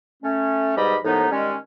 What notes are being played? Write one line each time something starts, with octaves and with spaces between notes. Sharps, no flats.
A3 C#4
G#2 B2 G3 G4 D#5 B5
D#2 A2 F3 B3 D#4
D#3 G3 G#3 C#4